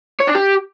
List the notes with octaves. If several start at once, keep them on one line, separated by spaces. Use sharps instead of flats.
C#5
D4
G4